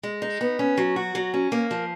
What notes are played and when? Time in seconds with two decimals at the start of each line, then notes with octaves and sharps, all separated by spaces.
0.03 G#3
0.22 D#4
0.41 B3
0.59 C#4
0.78 F#3
0.96 F#4
1.15 F#3
1.34 C#4
1.52 A#3
1.71 F3